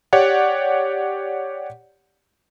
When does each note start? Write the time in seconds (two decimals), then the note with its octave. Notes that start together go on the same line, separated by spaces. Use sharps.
0.13 G4 C#5 D5 F#5